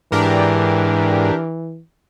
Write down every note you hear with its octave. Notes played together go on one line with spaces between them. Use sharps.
G#2 E3 D4 G4 A#4